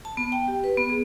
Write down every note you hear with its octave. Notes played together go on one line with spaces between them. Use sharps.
A5
B3
G5
G4
B4
B3
G#4